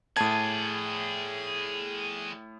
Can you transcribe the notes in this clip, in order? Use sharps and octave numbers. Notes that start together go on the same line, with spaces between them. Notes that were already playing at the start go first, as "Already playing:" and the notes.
A2 G#4 D5 A5 G#6